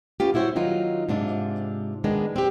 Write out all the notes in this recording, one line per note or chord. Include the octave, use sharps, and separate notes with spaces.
B3 C#4 F4 G4
G3 E4 F#4 C5 C#5
D#3 F#3 D#4 F4
G#2 C3 D4 F4
D#3 G#3 B3 D4
C4 G4